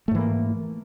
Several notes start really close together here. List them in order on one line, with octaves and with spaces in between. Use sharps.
A3 G#2 E3 A#3